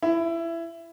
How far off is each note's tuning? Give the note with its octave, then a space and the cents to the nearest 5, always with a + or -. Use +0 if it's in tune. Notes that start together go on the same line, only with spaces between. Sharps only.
E4 +20